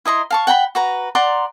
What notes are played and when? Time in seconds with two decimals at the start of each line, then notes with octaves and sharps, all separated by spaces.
0.05 E4 D#5 A#5 C6
0.30 F5 A5 C#6
0.47 F#5 G5 A#5 B5
0.75 F#4 B4 A#5
1.15 D5 F#5 A#5 C6